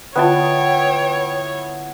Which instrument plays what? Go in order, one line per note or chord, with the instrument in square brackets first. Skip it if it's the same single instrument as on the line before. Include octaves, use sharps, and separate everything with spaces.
[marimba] D3 F4 [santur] B3 E4 A5 [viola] C#5 [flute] G5